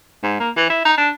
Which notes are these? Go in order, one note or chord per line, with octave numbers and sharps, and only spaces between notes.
G#2
A#3
E3
E4
D#4
D4